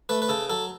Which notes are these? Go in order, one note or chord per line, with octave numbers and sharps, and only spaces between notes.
A3 B4
B4
C#3 A4
F#3 A4